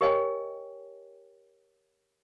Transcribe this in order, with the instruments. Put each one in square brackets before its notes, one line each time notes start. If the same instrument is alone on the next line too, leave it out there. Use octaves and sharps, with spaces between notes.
[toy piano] G4 A#4 C#5 D#5 G5 G#5